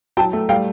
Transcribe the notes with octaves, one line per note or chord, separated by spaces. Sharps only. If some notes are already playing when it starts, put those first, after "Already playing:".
F#3 G5 A5
A3
G3 F5 G5